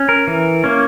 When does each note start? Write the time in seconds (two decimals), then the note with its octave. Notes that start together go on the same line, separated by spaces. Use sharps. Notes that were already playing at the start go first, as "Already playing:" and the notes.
Already playing: C#4
0.09 A#4
0.27 E3
0.64 A#3 C#4